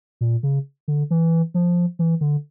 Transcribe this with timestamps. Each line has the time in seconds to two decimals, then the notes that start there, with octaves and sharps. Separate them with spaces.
0.21 A#2
0.43 C#3
0.88 D3
1.11 E3
1.54 F3
1.99 E3
2.21 D3